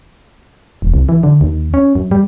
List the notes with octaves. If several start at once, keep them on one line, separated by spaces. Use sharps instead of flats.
E1
C2
E3
D3
D#2
C#4
F#2
G3